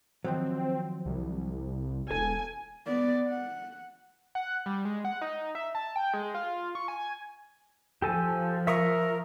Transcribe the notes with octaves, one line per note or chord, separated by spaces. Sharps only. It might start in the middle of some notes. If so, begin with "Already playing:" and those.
D#3 F3 F#3 C4
C2
E1 A4 G#5
B3 D5
F#5
F#5
G3
G#3
F#5
D#4
E5
A5
G5
G#3
F4
C#6
G#5
F3 G4 A4 G#5
A#4 E5 C#6 D#6